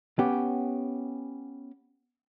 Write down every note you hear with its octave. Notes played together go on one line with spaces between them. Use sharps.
B3 C#4 G4